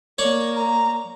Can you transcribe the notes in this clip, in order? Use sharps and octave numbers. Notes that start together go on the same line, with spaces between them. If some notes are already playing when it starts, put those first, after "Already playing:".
A#3 C#5 D5 C#6
A#5